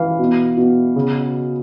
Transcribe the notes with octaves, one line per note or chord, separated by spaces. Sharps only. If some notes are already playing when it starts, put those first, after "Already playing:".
Already playing: E3 F5
B2
B2
C#3